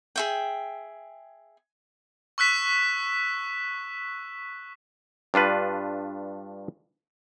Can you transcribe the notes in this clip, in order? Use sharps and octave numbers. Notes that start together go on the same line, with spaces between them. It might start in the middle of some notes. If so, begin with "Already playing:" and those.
G#4 E5 G5
C#6 E6 F#6 B6 E7
G2 D4 F4 B4